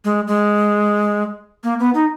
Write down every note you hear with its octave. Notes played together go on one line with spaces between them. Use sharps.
G#3
G#3
A#3
B3
D#4